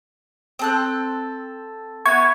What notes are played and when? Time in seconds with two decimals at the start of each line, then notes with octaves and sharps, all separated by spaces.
0.59 C4 A4 F#6
2.05 B3 E4 B4 C#6 G#6